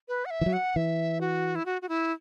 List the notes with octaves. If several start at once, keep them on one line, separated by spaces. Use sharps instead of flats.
B4
F#5
E5
E3
F#3
F#5
E3 E5
F#4
E4
F#4
F#4
E4